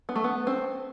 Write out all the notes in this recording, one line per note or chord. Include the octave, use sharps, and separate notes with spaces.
B3
A3
B3
C4